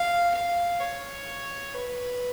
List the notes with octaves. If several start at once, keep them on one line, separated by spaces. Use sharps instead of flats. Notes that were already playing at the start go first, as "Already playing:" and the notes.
Already playing: F5
F5
C#5
B4